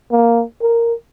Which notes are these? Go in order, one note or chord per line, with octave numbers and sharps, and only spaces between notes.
A#3
A#4